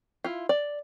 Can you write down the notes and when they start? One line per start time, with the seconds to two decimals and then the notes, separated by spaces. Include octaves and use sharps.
0.24 E4 F4
0.49 D5